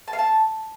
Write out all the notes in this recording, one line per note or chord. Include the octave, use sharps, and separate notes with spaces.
A5
F5
A5